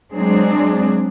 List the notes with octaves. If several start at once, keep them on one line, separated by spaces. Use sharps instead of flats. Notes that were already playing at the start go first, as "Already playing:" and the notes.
F#3 G#3 C4 D4 G#4